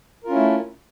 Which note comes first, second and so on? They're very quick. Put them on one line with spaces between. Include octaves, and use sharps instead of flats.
A#4 F4 C#4 E4 A3